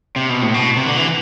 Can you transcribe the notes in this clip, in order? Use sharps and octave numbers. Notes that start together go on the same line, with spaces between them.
C3
B2
A2
B2
C3
D3
E3